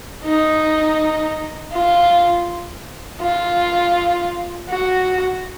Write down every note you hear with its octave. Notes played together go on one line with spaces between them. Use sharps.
D#4
F4
F4
F#4